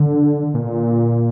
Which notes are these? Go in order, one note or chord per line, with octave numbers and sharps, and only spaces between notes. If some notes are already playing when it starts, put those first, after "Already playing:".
Already playing: D3
A#2